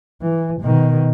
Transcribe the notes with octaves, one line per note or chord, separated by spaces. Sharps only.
E3
B2 D#3